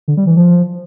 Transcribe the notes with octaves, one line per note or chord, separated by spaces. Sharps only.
D3
G3
E3
F3